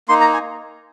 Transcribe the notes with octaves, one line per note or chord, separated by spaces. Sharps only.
A#3 D#4 C6
A#5
G#5